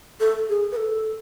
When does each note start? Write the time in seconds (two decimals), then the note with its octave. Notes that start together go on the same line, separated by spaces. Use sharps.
0.20 A4
0.49 G#4
0.72 B4
0.77 A4